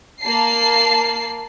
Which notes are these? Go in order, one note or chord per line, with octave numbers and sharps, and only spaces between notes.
A#3 A5 C7